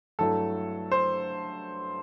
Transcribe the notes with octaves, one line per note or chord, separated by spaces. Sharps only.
G2 F#3 A3 E4 A4
C5